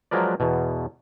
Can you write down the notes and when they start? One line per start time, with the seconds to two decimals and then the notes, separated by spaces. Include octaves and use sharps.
0.11 F3 F#3 G#3 A#4 B4 D5
0.40 E2 B2